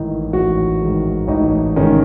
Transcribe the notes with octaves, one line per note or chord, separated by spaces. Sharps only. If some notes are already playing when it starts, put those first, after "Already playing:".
Already playing: A1 G#2 D#3 D#4 E4
A1 F#4
G#2 D#3
A1 D#4
G#2 D#3 C#4